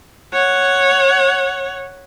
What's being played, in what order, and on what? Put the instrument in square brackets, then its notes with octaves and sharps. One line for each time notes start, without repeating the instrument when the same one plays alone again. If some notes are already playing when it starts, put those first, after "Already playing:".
[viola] C#5 F#5